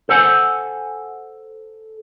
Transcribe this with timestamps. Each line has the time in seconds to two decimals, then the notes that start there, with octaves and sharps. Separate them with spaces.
0.09 A4 C5 F#5 G#5